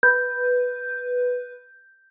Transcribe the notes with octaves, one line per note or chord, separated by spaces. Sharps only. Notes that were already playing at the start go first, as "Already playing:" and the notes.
B4 G6